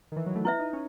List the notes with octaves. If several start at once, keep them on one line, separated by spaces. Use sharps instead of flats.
D#3
E3
F#3
A3
B3 E4 B4 E5
D#4
C#4